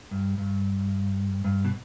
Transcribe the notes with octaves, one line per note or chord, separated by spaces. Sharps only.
G2
G2
G2
B2